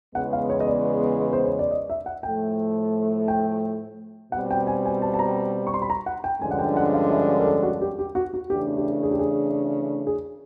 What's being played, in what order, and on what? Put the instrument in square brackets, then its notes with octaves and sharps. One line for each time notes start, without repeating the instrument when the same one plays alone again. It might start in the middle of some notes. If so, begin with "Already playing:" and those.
[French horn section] E2 C#3 E3 G#3 B3 [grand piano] F#5
[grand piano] F5
C#5
D#5
D5
C5
C#5
D5
D#5
E5
F#5
[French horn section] A2 F3 A3 [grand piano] G5
[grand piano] G5
[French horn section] B2 G3 C4 [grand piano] F#5
[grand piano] G5
G#5
G#5
A5
A5
A#5
C#6
C6
B5
A#5
F#5
G5
[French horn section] G2 D3 F3 G#3 C#4 [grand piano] G#5
[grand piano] F#5
G5
F#5
F5
E5
A#4
A4
F#4
G4
G4
F#4
F#4
[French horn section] C#3 E3 A3 D4 [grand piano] G4
[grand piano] G4
G#4
G4
G#4
G#4